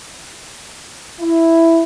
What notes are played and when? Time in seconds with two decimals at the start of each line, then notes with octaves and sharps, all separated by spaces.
1.20 E4